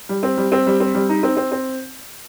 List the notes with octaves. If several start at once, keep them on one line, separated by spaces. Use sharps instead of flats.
G3
C4
G3
C4
G3
C4
G3
D#4
C4
C4
C4